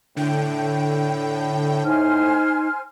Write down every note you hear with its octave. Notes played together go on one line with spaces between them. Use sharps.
A2 D3 G5
D#4 C5 G#5 F6